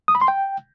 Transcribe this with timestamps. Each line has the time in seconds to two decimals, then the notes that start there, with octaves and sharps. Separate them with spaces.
0.08 D#6
0.15 B5
0.21 C6
0.28 G5